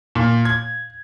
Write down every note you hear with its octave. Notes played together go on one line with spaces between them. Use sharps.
A#2
G#6